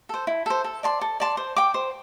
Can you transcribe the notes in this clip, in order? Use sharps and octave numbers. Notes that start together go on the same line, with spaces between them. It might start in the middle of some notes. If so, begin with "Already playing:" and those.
A4 C5
E4
A4 C5
A4
D5 A5 C6
A4
D5 A5 C6
C5
G5 D6
C5